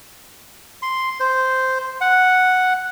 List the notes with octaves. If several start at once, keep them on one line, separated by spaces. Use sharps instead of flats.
C6
C5
F#5